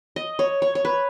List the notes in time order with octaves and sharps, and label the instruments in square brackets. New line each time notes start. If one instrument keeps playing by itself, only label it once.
[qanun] D#5
C#5
C#5
C#5
B4